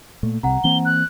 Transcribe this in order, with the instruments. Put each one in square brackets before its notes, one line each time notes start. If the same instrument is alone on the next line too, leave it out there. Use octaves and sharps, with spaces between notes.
[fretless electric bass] A#2 A3
[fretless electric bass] C2 C3 [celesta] F#5 A#5
[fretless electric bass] E3 A#3 C4 [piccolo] G7
[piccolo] F#6